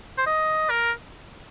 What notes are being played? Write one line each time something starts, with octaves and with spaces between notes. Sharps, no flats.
C5
D#5
A#4